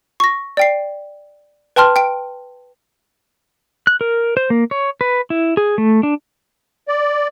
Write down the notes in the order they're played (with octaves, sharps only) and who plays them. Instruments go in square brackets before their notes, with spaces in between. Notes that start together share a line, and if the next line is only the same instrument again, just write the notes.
[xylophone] C#6 A#6
D5 G5 C7
B4 G5 A5 C6 F6
G5 D7
[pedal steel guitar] F#6
A#4
C5
A#3
C#5
B4
E4
G#4
A3
D4
[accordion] D5